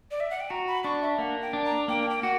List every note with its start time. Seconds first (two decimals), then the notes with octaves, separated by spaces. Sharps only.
0.11 D5
0.20 E5
0.30 F#5
0.40 G5
0.50 F#4 A#5
0.68 B5
0.84 D4 C#6
1.02 E5
1.18 A#3 F#5
1.42 G5
1.53 D4
1.65 A#5
1.88 A#3 G5
2.10 G5
2.23 F#4 F#5